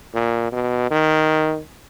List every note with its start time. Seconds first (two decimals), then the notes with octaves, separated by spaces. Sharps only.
0.14 A#2
0.52 B2
0.91 D#3